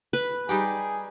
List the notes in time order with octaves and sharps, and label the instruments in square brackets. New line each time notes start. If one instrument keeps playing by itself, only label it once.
[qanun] B4
[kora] G3 D#4 G4 [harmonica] G#4